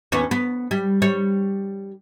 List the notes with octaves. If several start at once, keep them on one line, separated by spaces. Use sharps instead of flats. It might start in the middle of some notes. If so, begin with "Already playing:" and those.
D#2 B3 C#4
B3
G3
G3 C#5